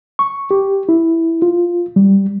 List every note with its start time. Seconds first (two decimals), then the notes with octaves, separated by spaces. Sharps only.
0.19 C#6
0.51 G4
0.89 E4
1.42 F4
1.96 G3